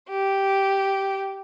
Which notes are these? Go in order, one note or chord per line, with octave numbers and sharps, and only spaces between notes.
G4